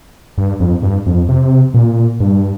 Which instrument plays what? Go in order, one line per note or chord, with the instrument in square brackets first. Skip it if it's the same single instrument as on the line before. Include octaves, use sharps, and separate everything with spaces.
[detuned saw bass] G2
F2
G2
F2
C3
A#2
G2